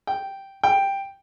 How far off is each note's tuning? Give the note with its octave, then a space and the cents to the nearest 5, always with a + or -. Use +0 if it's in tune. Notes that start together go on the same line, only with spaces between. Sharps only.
G5 -5
G5 +5